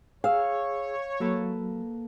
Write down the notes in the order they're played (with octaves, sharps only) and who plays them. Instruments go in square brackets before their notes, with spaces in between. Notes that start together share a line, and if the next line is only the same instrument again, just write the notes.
[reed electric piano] G#4 E6 [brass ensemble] C#5 [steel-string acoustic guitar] F5
[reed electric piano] F#3 [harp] A#3 A4 B4